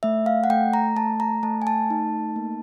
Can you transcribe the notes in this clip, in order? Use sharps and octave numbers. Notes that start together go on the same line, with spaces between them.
A3 E5
F5
F#5
A3 G5
A#5
A3 A5
A#5
A3 A5
G#5
A5
D#4
A#3